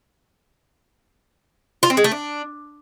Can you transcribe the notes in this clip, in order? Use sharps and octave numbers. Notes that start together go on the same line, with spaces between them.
F4
C4
G#3
A3
D4